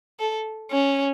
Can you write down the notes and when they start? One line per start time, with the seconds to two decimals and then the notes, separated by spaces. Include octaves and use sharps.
0.19 A4
0.71 C#4